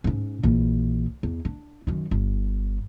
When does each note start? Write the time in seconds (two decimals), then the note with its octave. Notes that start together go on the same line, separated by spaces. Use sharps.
0.04 G#2 C#4
0.43 A#1 E3
1.23 E2
1.45 D4
1.87 F#2 D#3
2.11 G1